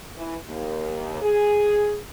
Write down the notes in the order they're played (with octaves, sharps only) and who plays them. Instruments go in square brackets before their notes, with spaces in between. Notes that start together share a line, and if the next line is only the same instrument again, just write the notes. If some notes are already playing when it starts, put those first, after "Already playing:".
[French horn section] E3
D#2
G#4